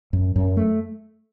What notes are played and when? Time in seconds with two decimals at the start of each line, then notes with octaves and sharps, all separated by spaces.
0.13 F#2
0.36 F#2
0.57 A3